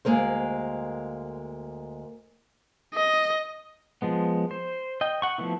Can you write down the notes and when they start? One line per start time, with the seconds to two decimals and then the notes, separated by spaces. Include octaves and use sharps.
0.05 D2 G#3 A#3 A#4 C5
2.94 D#5
4.02 F3 G#3 B3
4.51 C5
5.01 D#5 G5
5.22 F#5 C#6
5.38 F3 A3 B3 E4